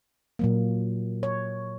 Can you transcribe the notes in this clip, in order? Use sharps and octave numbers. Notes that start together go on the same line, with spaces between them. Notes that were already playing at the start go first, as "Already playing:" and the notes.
A#2 F#3 A#3
C#5